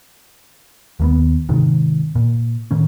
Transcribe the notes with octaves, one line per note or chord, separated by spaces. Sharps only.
D#2 A#3 B3
G#2 C3 D#3
A#2
A2 D#3 C#4